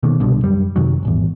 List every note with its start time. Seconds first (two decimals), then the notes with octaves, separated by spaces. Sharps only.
0.03 B2 D#3 A#3
0.20 C2 G2 B2 D3
0.43 F#2 G3
0.76 F#2 C3 D#3 F#3
1.03 D#1 G#1 E2